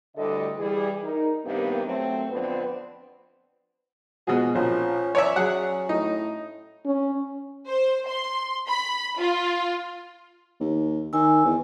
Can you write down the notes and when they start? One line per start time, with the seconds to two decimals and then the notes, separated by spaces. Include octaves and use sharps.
0.15 D2 A2 D3 G3 A4 D#5
0.57 E3 G3 G#4
1.02 D#4 A#4
1.45 G2 C3 D#3 A#3 B3
1.85 F#3 A3 C4
2.29 F2 D3 B3 C4 B4
4.27 B2 F3 G#3 F#4 G#4
4.55 A#1 F3 C#4
5.15 C#5 D5 E5
5.36 F#3 G#4 F#5
5.89 A2 D#4
6.86 C#4
7.68 C5
8.08 C6
8.67 B5
9.19 F4
10.60 D#2
11.13 D#3 G#5 E6
11.45 E2